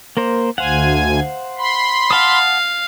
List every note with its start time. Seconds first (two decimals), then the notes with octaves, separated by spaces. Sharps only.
0.17 A#3 A#4 C5
0.58 D2 C5 F5 F#5 G#5
1.59 B5 C6
2.11 F5 F#5 A5 D#6